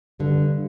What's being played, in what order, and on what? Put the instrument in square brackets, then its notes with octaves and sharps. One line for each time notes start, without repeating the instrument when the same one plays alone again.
[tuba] G2 [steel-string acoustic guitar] D3